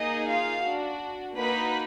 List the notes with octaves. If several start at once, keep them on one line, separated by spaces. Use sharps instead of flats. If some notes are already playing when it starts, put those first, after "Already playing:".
Already playing: A#3 D#4 G#4 D#5
F4 F5
D4 F#4
A#3 D#4 F#4 B4 B5